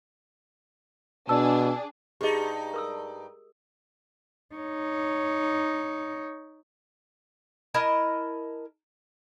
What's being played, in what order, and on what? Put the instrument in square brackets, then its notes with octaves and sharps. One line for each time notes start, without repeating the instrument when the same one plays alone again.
[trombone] B2 [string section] D4 G#4 [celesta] A5 E6
[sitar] G2 D#4 [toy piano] G4 G#4 D#5
[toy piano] A#4 D#6 E6
[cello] D#4 C#5
[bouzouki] E4 A#4 D#5 A5